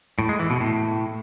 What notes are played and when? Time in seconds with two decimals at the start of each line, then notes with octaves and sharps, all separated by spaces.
0.19 A2
0.29 G#3
0.39 E3
0.50 B2
0.60 A2